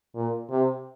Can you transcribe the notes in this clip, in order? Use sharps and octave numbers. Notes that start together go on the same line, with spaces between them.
A#2
C3